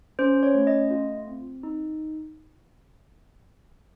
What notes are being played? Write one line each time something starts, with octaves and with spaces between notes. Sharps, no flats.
C#4 C5
C#5
A3
D#5
F4
C4
D#4